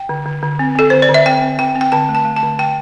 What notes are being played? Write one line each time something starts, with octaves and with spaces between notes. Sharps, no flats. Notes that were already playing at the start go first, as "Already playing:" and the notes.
Already playing: G5
D3
D3
D3
C4
C4 A4
D3 C5
D5
D3
E5
C4 G5
C4
D3 G5
C4
G5
D3 A5
A3
A5
A3
A5
D3
D3 G5